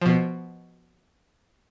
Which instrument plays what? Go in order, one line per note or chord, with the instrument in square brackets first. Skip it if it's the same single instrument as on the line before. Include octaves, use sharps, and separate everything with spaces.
[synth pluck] B2 F3